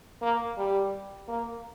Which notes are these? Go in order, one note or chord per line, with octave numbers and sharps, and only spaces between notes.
A#3
G3
A#3